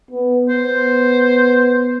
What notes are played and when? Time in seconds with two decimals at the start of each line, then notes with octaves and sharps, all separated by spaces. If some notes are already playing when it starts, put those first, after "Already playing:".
0.11 B3
0.49 B3 C5